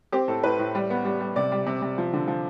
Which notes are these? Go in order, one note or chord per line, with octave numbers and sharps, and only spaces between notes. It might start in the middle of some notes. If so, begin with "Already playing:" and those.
C4 G4
A2 A4
A2 B4
A2
G3
B3
G3
G3
C3 D5
G3
C3
C3
F3
D3
F3